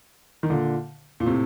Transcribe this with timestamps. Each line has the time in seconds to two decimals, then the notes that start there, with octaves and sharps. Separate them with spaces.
0.43 D#3
0.50 A#2 D3
1.20 A#2
1.26 A2 C3